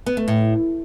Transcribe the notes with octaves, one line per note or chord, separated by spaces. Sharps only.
B3
A3
A2